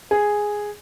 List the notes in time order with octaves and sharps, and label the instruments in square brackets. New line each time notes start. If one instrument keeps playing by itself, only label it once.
[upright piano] G#4